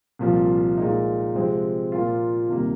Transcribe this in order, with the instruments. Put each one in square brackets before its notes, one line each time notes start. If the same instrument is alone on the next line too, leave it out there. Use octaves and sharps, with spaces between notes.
[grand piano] C2 A#2 F3
A#2 G#3 D#4
C3 F3 G#3 C4
A#2 A#3 F4
C2 C3 D#3 A#3